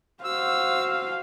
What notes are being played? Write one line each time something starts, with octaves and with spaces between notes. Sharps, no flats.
F#4 C5 F5 E6